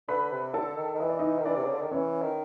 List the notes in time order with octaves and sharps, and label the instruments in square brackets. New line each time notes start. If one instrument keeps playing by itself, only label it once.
[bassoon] D3 [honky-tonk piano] B4 B5
[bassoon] C3
[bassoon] D3 [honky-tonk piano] A4 A5
[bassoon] D#3
D#3
[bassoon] E3 [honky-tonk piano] D#5
[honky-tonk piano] D5
D#4 D#5
[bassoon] D#3
[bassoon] E3 [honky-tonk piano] D4 D5
[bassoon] C3
C#3
D3
D#3
[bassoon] E3 [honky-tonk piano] C#4 C#5
[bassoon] D#3